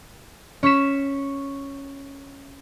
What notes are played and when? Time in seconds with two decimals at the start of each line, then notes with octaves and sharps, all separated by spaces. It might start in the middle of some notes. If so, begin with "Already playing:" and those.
0.63 C#4 C#6 B6 E7